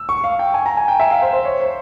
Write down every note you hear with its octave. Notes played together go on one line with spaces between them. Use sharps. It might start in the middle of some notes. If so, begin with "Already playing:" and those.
Already playing: E6
C#6
F5
G5
G#5
A#5
G#5
G5
E5
F5
C5
C5
C#5
C5